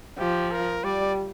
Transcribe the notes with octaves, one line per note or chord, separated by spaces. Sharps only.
F3 G4
A#4
G3 D5